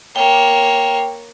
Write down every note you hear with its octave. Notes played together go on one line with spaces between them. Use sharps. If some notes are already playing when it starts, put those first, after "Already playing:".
A#3 C#5 G5